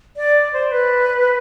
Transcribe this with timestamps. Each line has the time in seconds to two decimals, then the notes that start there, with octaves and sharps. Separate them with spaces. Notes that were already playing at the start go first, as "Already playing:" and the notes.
0.17 D5
0.53 C5
0.72 B4